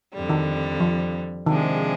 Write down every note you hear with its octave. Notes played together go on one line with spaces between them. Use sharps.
F2 D3 G3
D#3
F3
C3 D#3 F3 G#3 D4 G#4